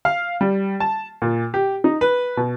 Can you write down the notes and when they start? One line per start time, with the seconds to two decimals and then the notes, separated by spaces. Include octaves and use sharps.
0.05 F5
0.41 G3
0.80 A5
1.22 A#2
1.54 G4
1.84 D#4
2.01 B4
2.37 B2